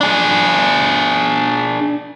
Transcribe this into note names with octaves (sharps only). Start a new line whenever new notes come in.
D4 G#4